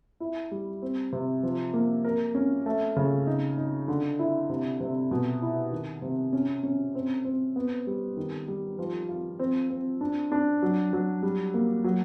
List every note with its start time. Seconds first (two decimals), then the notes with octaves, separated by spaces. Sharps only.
0.20 E4
0.51 G3
0.82 C4
1.13 C3
1.43 F3
1.74 A#3
2.04 A#4
2.35 C#4
2.66 A3
2.96 C#3
3.27 D#4
3.58 D#4
3.88 D3
4.19 E4
4.49 C3
4.80 C3
5.11 B2
5.42 E4
5.72 D#3
6.02 C3
6.33 C#4
6.63 C#4
6.95 C4
7.25 C4
7.56 B3
7.87 G3
8.17 D#3
8.48 G3
8.79 F3
9.09 F4
9.39 C4
9.70 C4
10.01 D4
10.32 D4
10.62 F#3
10.93 F#3
11.23 G3
11.54 A#3
11.84 F#3